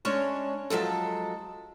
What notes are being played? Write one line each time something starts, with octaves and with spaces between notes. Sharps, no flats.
G#3 C#4 D4 C#5
F3 F#3 G#3 A4